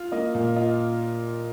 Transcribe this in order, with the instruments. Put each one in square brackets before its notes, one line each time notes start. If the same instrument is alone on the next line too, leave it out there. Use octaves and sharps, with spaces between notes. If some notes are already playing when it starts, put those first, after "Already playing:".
Already playing: [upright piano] F4
[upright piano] A#3 [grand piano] D#5
[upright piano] A#2 [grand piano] F5
[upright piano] F4 [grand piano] D#5